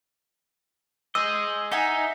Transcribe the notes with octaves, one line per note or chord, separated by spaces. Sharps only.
G#4 C5 D#5 E6
D#4 E5 F#5 G#5